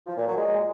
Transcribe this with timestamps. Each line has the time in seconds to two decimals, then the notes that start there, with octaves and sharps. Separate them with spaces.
0.07 F3
0.17 A#2
0.27 F#3
0.37 G#3